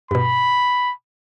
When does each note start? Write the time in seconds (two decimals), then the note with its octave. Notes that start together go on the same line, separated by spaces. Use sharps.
0.11 G2 B2 B5